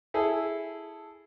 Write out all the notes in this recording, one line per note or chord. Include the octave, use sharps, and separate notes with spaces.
E4 G#4 A4